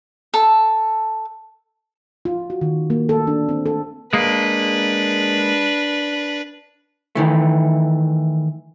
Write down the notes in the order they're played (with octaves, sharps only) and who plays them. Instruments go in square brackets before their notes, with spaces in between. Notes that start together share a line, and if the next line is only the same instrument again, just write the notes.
[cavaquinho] A4
[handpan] F4
F#4
D#3
A#3
A4
D4
C4
A4
[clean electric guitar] G#3 A#3 [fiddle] D4 B4
[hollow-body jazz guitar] D#3 E3 A3